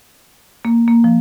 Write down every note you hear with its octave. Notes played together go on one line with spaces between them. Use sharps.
A#3
A#3
F3